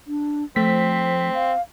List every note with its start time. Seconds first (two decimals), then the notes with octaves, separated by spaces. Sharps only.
0.07 D4
0.56 F3 A3 C4 B6
1.34 F5